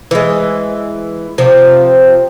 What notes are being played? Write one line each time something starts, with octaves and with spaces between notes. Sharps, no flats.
E3 G#3
C3 F3